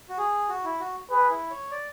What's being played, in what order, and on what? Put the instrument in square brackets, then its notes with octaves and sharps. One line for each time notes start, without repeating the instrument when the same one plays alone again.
[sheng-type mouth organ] F#4
G#4
F#4
E4
F#4
[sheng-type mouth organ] G#4 [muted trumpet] B4
[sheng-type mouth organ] E4
C#5
D5